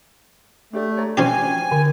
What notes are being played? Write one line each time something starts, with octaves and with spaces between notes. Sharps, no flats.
A3 D4 G4 D5
C#5 D5 A#5
F3 C#4 F#4 G4 B4 G5 G#5
D3